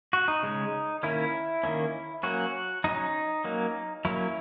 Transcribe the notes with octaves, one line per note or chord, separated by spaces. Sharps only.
F#4
D#4
C#3 G#3 C#4
D#3 A#3 C#4 E4
D#3 A#3 C#4
F#3 A#3 C#4 F#4
F#3 A#3 C#4 D#4
F#3 A#3 C#4
F#3 A#3 C#4 E4